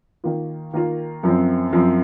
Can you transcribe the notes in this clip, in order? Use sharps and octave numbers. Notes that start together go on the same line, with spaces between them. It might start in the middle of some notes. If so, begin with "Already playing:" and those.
D#3 A#3 F4
D#3 A#3 F4
F#2 F3 C4
F#2 F3 C4